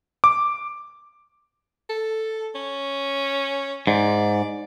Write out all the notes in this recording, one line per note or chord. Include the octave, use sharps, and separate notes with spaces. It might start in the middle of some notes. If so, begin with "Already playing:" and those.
D6
A4
C#4
G#2 D5